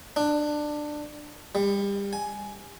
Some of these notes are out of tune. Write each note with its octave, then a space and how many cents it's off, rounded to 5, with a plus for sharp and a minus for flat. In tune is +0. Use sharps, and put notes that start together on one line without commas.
D4 +15
G3 +30
G#5 +15